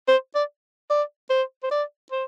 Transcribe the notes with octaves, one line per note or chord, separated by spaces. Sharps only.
C5
D5
D5
C5
C5
D5
C5